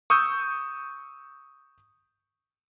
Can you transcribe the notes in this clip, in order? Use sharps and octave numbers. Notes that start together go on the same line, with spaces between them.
C#6 D#6 E6 G6